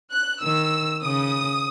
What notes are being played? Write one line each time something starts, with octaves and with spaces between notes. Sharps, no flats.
F#6
D#3 E6
C#3 D#6